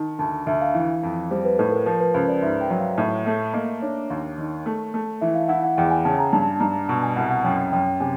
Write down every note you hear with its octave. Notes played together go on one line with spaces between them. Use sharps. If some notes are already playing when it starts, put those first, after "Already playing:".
Already playing: D#3 A5
D2 A5
D2 E5
F5
E3 F5
F2
G3 C5
B4
A2 A4
A#4
F3 A#4
B4
C#2 C5
D5
G#2 E5
G5
F#3
F5
A2 E5
A3 E5
A#3 D#5
D4 C#5
D#2
D#3
A3
A3
E3 E5
F5
E4 F#5
F#5
E2 G5
G#5
C#3 A5
A#5
G2 A5
G2 A#5
B2 A5
G#5
C2 F#5
F#5
F#2 G5
F#2 G5
C3 G#5